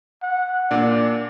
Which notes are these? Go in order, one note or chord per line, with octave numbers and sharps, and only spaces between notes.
F#5
A#2 D4 D5